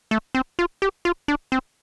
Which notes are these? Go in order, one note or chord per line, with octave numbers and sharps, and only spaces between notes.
A3
C4
F4
G4
F4
D4
C4